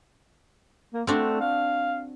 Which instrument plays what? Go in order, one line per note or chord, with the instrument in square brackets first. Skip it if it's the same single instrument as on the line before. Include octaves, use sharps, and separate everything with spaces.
[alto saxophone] A#3
[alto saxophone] A3 [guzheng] C4 D4 F#4
[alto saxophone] F5